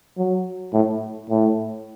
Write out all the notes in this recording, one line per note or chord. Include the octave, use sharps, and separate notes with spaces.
F#3
A2
A2